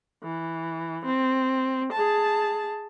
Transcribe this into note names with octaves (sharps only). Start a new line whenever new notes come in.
E3
C4
G#4 A5